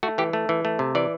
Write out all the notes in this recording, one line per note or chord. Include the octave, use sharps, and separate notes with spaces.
A3 F#4
E3 G4
A3
E3
A3
C3
E3 D5